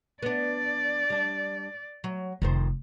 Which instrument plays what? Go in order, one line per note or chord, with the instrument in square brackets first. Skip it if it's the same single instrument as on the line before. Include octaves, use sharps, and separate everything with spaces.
[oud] B3 D4 [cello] D5
[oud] G3 D4
F#3
[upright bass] F1 [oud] F2 D#3 C5